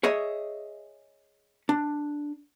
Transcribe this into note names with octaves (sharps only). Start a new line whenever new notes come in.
G#4 C#5 D#5 E5
D4